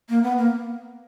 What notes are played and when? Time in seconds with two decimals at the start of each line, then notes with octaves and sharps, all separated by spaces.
0.09 A#3
0.23 B3
0.38 A#3